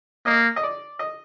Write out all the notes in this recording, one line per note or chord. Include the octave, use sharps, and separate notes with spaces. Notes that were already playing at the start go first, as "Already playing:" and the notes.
A#3 D#5
D#5
D5
D#5